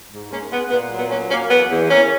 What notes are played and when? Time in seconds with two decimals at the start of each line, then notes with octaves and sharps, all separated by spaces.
0.11 G#2
0.31 G#3 A#3 C#4
0.52 G#3 B3
0.70 A#2 B3
0.90 F#3
0.98 B3
1.10 A#2 A#3 C#4
1.30 F#3 A#3 C#4
1.50 E2 B3
1.69 E2
1.89 E2 A#3 C#4